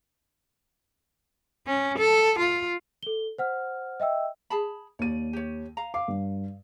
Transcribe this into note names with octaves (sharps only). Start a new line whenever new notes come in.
C#4
A4
F4
A4 G7
C5 F#5 F6
D#5 E5 G5 E6
G#4 A5 B5
D#2 C#5 D5 D#7
G4 C#5
F5 A#5
F5 D6
G2